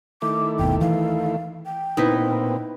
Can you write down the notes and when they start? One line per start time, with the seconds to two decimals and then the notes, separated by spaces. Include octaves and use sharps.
0.22 D#3 A3 E4 D6
0.59 G1 D#2 B2 G5
0.81 E3 F5
1.66 G5
1.97 A#2 B3 C4 D#4 E4 B4